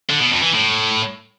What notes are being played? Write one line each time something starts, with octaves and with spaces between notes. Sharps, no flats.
D3
B2
F2
E3
A2